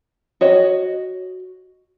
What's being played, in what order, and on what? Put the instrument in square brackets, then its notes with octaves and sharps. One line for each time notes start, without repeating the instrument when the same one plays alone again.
[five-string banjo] F#4 C#5 D#5